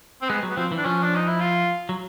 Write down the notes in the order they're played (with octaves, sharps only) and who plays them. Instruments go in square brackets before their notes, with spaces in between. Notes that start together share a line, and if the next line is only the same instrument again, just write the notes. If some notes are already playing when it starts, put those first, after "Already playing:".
[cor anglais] C4
[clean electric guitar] G#3 [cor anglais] B3
[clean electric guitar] F#3
[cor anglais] B3
[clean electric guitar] F3 [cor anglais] C4
[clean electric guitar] E3
[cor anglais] D4
[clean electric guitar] F3 [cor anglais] C#4
[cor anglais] D4
D#4
E4
F4
[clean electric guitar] F#3